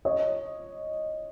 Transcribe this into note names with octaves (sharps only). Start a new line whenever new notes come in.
C#5 D#5